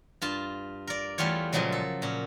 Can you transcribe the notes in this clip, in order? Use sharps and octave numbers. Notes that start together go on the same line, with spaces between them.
G2 F4 A5
A#4 D5
E2 G3 A3 F4 C#5
A#2 C#3 F3 F#3 G#3
A4
A#2 C#4